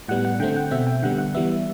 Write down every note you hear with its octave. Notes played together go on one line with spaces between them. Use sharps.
A2 G3 B3 F#5
F#5
D3 A3 C4 G5
F#5
B2 A3 C4 E5
G5
D3 G3 B3 F#5
F#5
E3 G3 B3 E5